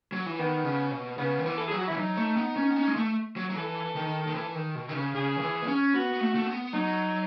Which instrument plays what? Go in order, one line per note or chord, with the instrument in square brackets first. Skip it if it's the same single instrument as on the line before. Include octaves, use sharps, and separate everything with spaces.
[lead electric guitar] F#3
E3
[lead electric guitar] D#3 [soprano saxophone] B3
[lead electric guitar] C#3
B2
[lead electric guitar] C#3 [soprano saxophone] B3
[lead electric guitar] D#3
E3
[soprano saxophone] A4
[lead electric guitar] F#3 [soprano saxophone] G#4
[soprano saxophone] F#4
[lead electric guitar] E3 [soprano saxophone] E4
[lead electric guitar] F#3 [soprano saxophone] D#4
[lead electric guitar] A3
B3
C#4
B3
C#4
G#3
A3
F#3
F#3
[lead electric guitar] E3 [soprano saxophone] A4
[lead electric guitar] D#3
D#3
E3
D#3
B2
D#3
C#3
[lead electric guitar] C#3 [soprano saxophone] G#4
[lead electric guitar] D#3
E3
B3
C#4
[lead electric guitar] B3 [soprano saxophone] F#4
[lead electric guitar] B3
A3
A3
B3
[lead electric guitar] F#3 [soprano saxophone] D#4